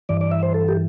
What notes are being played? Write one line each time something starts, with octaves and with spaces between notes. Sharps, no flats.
G2 E3 D5
D5
E5
C5
A4
G4